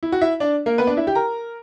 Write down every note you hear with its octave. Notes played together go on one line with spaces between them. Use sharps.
E4
F#4
E4 E5
D4 D5
A#3 A#4
B3 B4
D4 D5
E4 E5
G4 G5
A#4 A#5